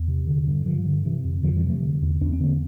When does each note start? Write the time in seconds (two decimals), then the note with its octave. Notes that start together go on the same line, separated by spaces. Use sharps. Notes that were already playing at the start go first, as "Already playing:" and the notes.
Already playing: E2
0.08 C3
0.27 D3
0.47 G2
0.65 G2 D3 F3
0.85 D3
1.05 C3 E3
1.24 F2
1.43 F2 D3 F3
1.56 E3 G3
1.63 C3
1.69 F3 A3
1.83 D3
2.02 E2
2.21 E2 D4
2.33 C4
2.41 D3 A#3